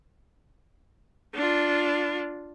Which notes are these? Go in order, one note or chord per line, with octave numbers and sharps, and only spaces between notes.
D4 F4